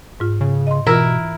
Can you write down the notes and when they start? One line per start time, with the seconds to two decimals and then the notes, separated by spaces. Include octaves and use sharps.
0.20 G#2 F4
0.41 C#3
0.67 D#5 C6
0.86 B2 E3 E4 F4 A#4 E5